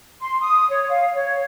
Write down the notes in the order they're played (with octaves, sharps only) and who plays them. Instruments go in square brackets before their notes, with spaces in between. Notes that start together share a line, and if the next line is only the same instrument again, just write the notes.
[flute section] C6
D#6
C#5
F5
C#5